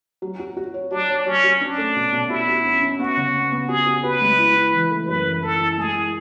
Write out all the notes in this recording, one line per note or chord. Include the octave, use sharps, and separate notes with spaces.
F#3
F#4
F#4
C#5
F#3 D4
C#5
F#3 C#4
F#3
C#4 D4
A3
B2
B2
E4 F#4
F#4
C#4
C#4
B3 F#4
C#3
B3
B3
F#4 G#4
F#4
F#4 B4
G#3
E4
E4
E3
A3
F#2 B4
E3
E4 A4
E4
G#3 G#4
E4